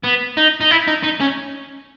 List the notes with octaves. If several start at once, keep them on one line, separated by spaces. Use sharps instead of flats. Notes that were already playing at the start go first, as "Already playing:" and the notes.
B3
D#4
D#4
E4
D#4
D#4
C#4